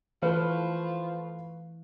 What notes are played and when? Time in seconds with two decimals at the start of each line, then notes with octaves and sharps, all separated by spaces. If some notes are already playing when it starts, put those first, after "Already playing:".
0.22 E3 F3 A3 B4 F5